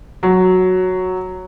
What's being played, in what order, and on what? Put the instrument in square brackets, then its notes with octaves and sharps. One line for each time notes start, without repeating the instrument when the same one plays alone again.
[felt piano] F#3